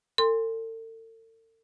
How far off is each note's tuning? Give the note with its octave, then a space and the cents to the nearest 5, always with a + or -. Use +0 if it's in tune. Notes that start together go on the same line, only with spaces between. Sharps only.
A4 +40 G#5 -40 C6 +0